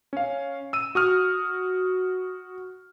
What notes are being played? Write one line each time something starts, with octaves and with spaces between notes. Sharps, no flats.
C#4 F5
E6 D#7
F#4 D#6 F6